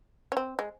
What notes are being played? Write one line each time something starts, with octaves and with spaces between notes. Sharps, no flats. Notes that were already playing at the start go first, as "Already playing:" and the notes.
C#4
C4
G#3